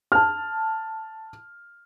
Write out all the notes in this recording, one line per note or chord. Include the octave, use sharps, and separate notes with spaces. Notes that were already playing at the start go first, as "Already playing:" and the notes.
A5 F6